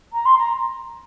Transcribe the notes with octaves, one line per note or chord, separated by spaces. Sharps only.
A#5
C6
A#5